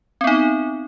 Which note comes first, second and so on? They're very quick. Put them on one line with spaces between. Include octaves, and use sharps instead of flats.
C4 B3 D#4